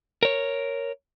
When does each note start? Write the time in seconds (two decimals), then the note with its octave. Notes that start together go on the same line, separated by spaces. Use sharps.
0.23 A#4 C#5